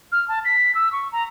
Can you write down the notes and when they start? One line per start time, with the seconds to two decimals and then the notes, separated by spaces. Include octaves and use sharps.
0.12 F6
0.28 A5
0.45 B6
0.75 E6
0.93 C#6
1.12 A#5